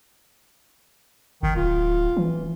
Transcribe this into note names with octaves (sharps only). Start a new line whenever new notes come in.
G1 D#3
D1 F4
E3